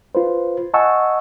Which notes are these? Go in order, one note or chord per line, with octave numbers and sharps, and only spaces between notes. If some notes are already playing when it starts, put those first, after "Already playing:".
F4 B4 C5
D#5 F#5 G#5 A5 C#6 E6